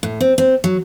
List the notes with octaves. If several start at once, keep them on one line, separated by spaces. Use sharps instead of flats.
A2
C4
C4
F#3